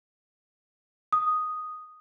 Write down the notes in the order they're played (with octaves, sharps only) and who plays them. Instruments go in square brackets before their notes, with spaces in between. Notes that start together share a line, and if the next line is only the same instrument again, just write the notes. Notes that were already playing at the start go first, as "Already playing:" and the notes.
[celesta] D#6